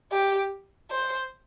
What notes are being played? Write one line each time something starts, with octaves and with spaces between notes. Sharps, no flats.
G4
C5